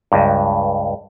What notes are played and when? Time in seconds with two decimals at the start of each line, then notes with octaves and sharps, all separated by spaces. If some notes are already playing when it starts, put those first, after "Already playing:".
0.12 C#2 G2